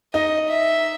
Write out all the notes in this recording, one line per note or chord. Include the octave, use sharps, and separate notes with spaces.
D#4 D#5
E5